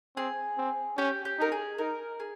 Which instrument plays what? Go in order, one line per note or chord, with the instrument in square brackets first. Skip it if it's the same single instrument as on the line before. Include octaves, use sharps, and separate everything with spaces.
[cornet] C4 [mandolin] G#4
[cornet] C4
[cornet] C#4 [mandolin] G4
[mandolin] G4
[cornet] D#4 [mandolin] A#4
[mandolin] G#4
[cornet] D#4 [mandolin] A#4
[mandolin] G#4